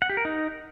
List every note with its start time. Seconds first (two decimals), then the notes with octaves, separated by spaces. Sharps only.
0.02 F#5
0.10 G4
0.17 A#4
0.25 D#4